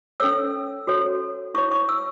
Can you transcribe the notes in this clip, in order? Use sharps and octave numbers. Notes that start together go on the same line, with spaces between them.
C#4 A4 C#5 E6
F#4 A4 C#5
E4 C#5 C#6
C#6
E6